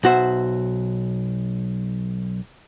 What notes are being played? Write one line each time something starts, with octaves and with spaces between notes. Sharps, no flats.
B1 F#4 C5 E5